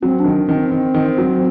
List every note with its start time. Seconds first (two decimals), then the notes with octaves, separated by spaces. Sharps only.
0.02 F#3 C4
0.20 D4
0.25 D#3
0.47 D#3 C#4
0.55 C4
0.71 D#3
0.94 D#3
1.18 F#3